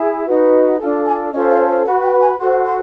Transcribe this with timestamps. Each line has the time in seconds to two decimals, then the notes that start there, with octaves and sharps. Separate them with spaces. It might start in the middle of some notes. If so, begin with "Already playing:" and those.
Already playing: E4 G#4
0.26 D#4 F#4 B4
0.79 D4 F4 A4 A5
1.06 G#5
1.32 C#4 F4 A4 C5 D#5
1.50 F5
1.67 F5
1.85 F#4 B4 F#5
2.02 G5
2.21 G#5
2.38 F#4 A4 C5 C6
2.64 C6